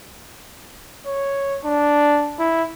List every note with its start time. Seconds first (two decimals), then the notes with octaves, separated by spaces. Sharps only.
1.06 C#5
1.65 D4
2.39 E4